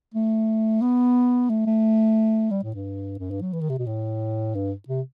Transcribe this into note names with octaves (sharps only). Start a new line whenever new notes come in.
A3
B3
A3
A3
G3
A2
G2
F#2
G2
F#3
E3
D#3
C3
B2
A2
G2
C3